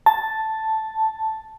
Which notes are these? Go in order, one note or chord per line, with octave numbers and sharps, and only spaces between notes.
A5